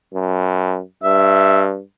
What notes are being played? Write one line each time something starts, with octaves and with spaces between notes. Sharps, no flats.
F#2
G2 E5